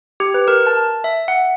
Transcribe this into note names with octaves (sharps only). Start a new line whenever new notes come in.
G4
B4
A#4
A5
E5
F#5